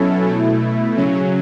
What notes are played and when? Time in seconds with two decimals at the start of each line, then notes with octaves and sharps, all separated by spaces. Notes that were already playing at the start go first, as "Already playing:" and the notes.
Already playing: B2 F#3 C#4 E4 A4
0.26 B2 A3 E4
0.97 C#3 F#3 C#4